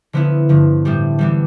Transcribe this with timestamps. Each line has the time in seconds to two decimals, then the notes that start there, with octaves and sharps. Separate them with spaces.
0.13 D3 F3 B3 E4
0.49 G2 D3 F3
0.85 A2 G3 D4 G4
1.19 E3 G3 B3 D4